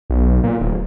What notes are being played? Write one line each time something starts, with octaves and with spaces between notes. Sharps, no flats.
B1
A#2
D1